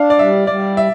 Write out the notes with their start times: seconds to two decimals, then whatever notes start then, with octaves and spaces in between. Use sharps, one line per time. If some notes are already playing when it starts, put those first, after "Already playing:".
Already playing: D4 F5
0.10 D5
0.19 G3 E5
0.47 G3 D5
0.77 E5